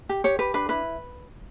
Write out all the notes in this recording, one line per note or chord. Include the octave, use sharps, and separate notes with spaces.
G4
G4 C#5
G4 B4
D4 B4
E4 B4